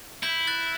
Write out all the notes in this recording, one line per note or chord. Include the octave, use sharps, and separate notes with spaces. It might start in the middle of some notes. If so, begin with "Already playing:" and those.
E4 G6 B6
F#6 A6